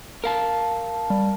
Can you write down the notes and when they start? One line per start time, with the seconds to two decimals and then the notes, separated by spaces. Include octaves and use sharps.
0.24 A#4 F5 A5
1.10 G3